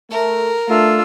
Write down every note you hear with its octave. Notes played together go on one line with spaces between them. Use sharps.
A3 A#4
A3 D4 F4 E6